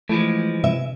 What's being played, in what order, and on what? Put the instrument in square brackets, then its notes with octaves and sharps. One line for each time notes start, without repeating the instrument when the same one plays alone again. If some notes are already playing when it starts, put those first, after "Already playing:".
[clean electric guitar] E3 F3 G#3 [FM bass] A3
[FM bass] C3 [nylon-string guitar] E5